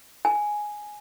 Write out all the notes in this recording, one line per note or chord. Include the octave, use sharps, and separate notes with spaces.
G#5